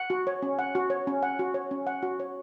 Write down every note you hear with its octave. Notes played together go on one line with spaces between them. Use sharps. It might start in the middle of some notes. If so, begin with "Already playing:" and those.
Already playing: F#5
F#4
C#5
C#4
F#5
F#4
C#5
C#4
F#5
F#4
C#5
C#4
F#5
F#4
C#5